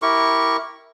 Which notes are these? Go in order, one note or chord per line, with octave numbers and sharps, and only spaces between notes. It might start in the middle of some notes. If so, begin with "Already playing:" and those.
E4 G4 A#4 C#6